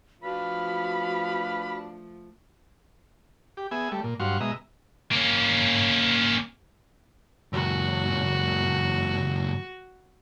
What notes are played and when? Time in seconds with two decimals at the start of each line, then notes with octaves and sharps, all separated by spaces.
0.23 F3 A3 D4 F#4 B4 F5 B5
3.57 G4
3.71 B3 G#4 E5 G#5
3.92 G3 A3
4.03 A#2
4.20 G2 F#3 F#4 F5 C6 C#6
4.40 B2 G#3 D#5 E5 A#5
5.11 A#3 C#4
7.53 C#2 F#2 F#4